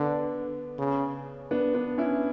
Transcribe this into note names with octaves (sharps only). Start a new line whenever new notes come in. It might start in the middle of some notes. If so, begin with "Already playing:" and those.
Already playing: D3 B3 D4
C#3
B3 D4
B3 D4
C#4 E4